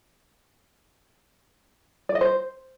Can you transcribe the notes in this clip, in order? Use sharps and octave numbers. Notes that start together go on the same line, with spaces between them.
D5
D#5
C5